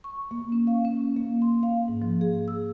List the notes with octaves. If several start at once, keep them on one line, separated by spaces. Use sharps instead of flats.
C#6
A#3
C#4
F5
C#4
A#3
C6
F5
G#2
F3
G#4
E6